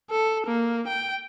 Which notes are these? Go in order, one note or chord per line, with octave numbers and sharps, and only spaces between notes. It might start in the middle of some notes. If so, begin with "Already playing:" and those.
A4
A#3
G5